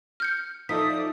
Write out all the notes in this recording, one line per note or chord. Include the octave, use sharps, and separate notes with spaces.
F6 G6 C#7
F3 D#4 A4 D5 E5 D#6 B6